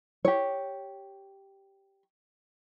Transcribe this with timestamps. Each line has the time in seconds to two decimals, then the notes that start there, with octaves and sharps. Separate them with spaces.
0.25 G4 C#5